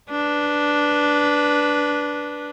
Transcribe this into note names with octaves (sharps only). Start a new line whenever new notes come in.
D4 B4